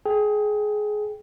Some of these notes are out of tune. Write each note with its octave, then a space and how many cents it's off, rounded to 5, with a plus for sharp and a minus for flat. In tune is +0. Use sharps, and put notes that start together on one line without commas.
G#4 +20 G5 +0